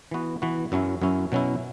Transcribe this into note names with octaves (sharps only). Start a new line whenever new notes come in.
E3 B3 F#4
E3 B3 F#4
F#2 F#3 C#4 E4
F#2 F#3 C#4 E4
B2 F#3 C#4 E4